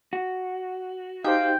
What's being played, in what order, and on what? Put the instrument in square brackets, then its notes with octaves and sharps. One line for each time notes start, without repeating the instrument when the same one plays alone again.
[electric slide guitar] F#4
[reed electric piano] D#4 G4 C5 [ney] F5 [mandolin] G5